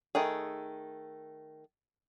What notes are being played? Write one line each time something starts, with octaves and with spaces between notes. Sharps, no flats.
D#3 A3 G#4